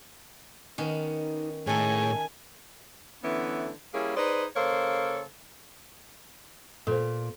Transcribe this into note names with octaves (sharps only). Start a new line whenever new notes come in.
D#3 B3 C#4 D#4
A2 D#3 G#4 A4 C#5 G#5
D3 E3 A3 B3 C#4
G3 A#3 C#4 E4 G#4
D#4 G#4 B4 C5 D5
C#3 A#3 A4 C5 C#5
A#2 A4 C5